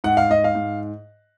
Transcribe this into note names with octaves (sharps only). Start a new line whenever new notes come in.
G#2 F#5
F5
G#2 D#5
F5
G#2